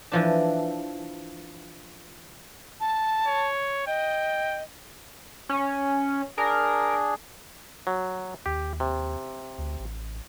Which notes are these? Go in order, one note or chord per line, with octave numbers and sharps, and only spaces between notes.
E3 F3 D4
A5
C#5
D#5 G5
C#4
D4 G#4 A#4
F#3
D#2 G4
C3
D2
A1